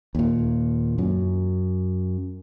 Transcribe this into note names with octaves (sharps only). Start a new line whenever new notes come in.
D#2 A#2
F#2